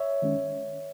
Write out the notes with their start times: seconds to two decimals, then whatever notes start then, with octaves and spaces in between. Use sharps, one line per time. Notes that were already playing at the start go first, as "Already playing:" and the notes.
Already playing: C#5 E5
0.22 D#3 G#3 C#4